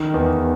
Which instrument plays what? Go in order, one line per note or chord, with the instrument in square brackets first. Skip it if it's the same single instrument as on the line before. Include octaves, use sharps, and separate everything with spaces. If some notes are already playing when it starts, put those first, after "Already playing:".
Already playing: [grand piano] D#3
E2